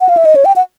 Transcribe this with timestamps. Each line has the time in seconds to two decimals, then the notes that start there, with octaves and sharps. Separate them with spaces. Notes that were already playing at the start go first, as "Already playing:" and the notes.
0.01 F#5
0.09 F5
0.17 E5
0.25 D#5
0.36 C#5
0.45 G5
0.56 F#5